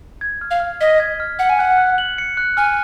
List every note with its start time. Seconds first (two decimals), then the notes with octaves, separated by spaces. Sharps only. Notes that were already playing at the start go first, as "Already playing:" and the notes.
0.21 G#6
0.41 F6
0.51 F5
0.60 F6
0.81 D#5 B6
1.00 G#6
1.20 F6
1.39 F#5 C#7
1.49 G#5
1.59 F#5 F#6
1.78 F#6
1.98 F#7
2.18 C#7
2.37 F#6
2.57 G#5 F6